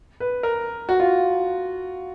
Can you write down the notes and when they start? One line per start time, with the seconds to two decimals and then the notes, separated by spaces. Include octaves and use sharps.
0.20 B4
0.43 A#4
0.89 F#4
1.00 F4